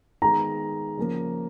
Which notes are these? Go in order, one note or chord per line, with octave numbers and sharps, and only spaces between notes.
D#3 G#3 B3 A#5
C#3 F3 A#3